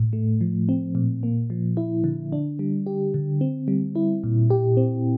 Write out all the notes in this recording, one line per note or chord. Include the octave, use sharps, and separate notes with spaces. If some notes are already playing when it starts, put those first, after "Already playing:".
Already playing: A2
A3
F3
C4
A#2
A#3
F3
E4
D3
D4
G3
G4
D3
C4
G3
E4
A#2
G4
C4